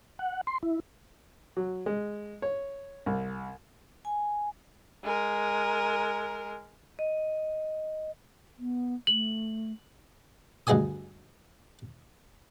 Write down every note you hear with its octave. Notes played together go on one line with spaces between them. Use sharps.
F#5
C6
E4
F#3
G#3
C#5
C2
G#5
G#3 A#4
D#5
B3
A3 F#7
D2 G2 G#4 D#5 G#5 D#6